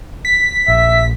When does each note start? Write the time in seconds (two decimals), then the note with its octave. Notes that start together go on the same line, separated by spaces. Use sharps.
0.25 B6
0.68 A#1 E5